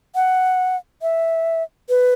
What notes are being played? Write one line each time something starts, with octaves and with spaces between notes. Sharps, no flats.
F#5
E5
B4